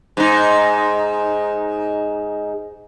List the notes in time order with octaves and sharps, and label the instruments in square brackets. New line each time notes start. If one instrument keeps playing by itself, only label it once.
[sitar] G#2 D#4